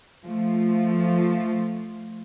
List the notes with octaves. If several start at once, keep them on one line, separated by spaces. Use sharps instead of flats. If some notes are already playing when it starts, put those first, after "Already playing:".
F3 A3 F4